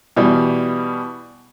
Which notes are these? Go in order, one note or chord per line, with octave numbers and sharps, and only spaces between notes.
B2 E3 G3